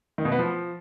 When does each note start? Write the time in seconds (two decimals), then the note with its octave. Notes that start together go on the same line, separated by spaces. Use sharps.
0.18 D#3
0.25 B2
0.32 B3
0.39 F3